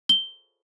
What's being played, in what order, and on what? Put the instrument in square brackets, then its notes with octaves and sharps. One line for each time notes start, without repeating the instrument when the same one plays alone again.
[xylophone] G7